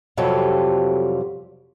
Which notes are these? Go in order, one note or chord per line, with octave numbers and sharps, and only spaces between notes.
F2 C3 F#3 G3 F4 A4